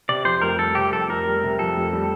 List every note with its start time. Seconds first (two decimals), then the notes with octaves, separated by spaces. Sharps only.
0.08 C3 D5
0.25 F2 C5
0.42 F1 A#4
0.59 G3 A4
0.75 C3 G4
0.92 F2 A4
1.09 F1 A#4
1.26 G3
1.43 C3
1.59 F2 A4
1.77 F1
1.93 G3